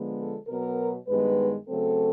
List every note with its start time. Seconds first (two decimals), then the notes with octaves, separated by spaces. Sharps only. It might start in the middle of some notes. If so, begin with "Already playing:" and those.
Already playing: D3 F3 G#3 B3
0.17 A4
0.47 B2 F#3 B3 A#4
1.08 G2 D#3 G#3 B3 B4
1.69 C#3 F#3 A3 C4 A4